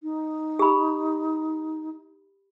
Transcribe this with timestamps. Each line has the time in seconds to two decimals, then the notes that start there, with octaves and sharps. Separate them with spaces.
0.03 D#4
0.59 G4 B5